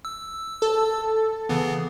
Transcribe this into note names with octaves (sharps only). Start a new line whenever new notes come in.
E6
A4
C#3 E3 B3